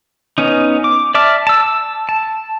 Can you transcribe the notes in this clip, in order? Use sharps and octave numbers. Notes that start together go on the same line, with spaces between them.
B3 C#4 D#4
D6
D5 E5 A5 D6 F6
A5 E6
A5